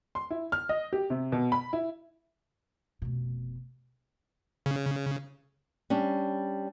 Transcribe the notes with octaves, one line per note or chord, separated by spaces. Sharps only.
C6
E4
F6
D#5
G4
C3
B2
B5
E4
F1 B2
C#3
G3 C#4 D4